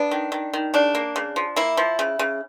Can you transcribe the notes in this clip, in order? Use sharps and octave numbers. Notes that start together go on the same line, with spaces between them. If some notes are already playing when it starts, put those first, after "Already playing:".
Already playing: B3 D4
D#3
D#3
D#3
C#3 D4
A#3
C#3
F3
A#3 E4
F3
C#3
C#3